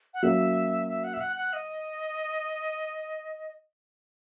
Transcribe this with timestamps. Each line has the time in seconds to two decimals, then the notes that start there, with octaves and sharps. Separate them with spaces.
0.14 F#5
0.23 F#3 A#3 C#4 E5
0.88 E5
1.04 F#5
1.13 E5
1.20 F#5
1.36 F#5
1.53 D#5